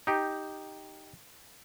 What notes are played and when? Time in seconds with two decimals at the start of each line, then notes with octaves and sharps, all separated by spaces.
0.07 D#4 G4